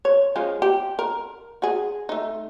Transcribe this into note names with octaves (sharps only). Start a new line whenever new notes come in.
C#5
F3 G#3 C#4
G4
A#4
F#4 G#4
A3 D#4